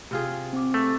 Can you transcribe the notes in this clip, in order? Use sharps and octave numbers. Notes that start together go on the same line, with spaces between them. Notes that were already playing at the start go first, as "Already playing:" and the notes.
C3 F4 G#4
C4 D6
A3